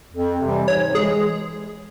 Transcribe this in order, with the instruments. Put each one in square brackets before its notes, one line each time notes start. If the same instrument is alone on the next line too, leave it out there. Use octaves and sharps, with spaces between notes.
[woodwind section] F2
C3 E3 G3
[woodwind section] G#2 [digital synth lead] C#5
[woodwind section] E3 G#3 [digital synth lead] G#4